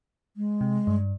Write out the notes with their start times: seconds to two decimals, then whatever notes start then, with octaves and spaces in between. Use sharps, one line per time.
0.37 G#3
0.61 C3
0.87 G2